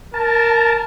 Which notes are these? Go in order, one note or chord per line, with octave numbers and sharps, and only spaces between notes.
A#4 A5